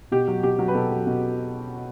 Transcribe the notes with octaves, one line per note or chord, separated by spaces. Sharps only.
B2 G4
F#3
B2 G4
F#3
B4
B2 A4
F#3
B2